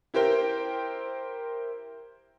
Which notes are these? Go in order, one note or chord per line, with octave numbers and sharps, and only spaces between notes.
E4 G4 A#4 C5 G5